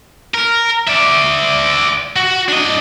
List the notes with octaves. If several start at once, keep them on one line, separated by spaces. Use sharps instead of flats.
A#4
D5 E5
F#4
D4 D#5